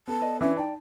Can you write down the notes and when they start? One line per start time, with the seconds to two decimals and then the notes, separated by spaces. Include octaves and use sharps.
0.08 B3 A4 A5
0.21 B4 D5 D#5
0.41 E3 C#4 D4 E5
0.57 D#4 D5 G5 A5